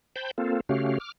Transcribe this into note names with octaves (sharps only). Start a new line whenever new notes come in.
C5 G5 A5 B5 G6
A#3 C4 F4 A4
C#3 A3 C#4 F#4 G4 F5
D6 F6